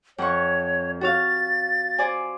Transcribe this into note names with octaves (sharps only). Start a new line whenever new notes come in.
F2 C#5 F#5 C#6
F#4 C#5 F5 A6
C5 D5 G#5